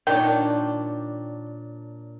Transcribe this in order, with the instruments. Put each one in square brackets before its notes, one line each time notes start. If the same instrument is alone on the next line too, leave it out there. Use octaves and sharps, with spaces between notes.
[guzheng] A#2 D4 C#5 [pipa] D#3 G5